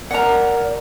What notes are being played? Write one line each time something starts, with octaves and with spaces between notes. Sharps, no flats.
A#4 D5 F#5 A#5